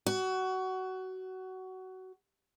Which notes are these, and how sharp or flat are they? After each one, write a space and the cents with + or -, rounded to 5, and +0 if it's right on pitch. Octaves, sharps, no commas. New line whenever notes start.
F#4 +20